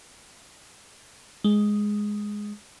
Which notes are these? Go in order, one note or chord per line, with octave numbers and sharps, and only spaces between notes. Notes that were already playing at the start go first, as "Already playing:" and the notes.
G#3